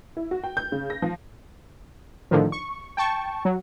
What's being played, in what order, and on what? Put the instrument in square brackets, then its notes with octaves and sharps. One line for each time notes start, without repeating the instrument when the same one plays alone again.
[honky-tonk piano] E4
F#4
G5
G6
C#3
A#6
F3
[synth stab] A2 D3 D#3 F3
C#6
G5 A5 C#6
F#3